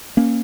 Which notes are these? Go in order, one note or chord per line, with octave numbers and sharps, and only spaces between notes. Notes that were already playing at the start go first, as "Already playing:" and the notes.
A#3 C#4